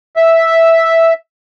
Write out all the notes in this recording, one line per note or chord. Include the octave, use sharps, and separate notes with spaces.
E5